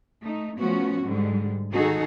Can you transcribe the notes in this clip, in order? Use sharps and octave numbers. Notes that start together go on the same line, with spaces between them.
A3 D#4
F3 A3 B3 C#4 F#4
G#2 D3 G3 G#3
D#3 D#4 F#4 G#4 A4